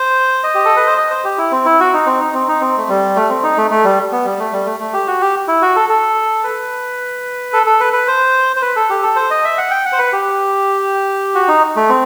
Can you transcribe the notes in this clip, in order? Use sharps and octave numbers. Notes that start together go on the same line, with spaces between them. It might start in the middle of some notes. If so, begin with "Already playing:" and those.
Already playing: C5
D#5
G4
A4
B4
C5
D#5
C5
G4
E4
C4
E4
F#4
D#4
C4
D#4
C4
D#4
C4
A3
G3
A3
C4
D#4
A3
A3
G3
B3
G3
A3
G3
A3
A3
G4
F#4
G4
E4
F#4
A4
A4
B4
A4
A4
B4
B4
C5
C5
B4
A4
G4
A4
C5
D#5
E5
F#5
G5
F#5
C5
B4
G4
F#4
D#4
A3
C4